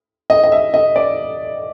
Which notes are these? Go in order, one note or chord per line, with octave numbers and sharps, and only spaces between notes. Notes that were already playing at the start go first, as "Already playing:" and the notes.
D#5
D#5
E5
D#5
D5